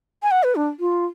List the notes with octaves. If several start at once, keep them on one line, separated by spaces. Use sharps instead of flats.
G#5
F#5
B4
D4
F4